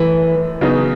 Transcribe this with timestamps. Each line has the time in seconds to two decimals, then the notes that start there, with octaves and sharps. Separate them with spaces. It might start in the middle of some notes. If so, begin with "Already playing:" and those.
Already playing: F#2 E3 A3
0.61 C#3 F#3 B3 D#4